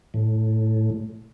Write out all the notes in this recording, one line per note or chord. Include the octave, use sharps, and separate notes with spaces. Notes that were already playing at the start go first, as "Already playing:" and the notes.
A2